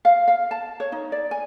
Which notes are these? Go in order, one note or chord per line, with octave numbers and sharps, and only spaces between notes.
F5
F5
A5
C#5
D#4
D5
G#5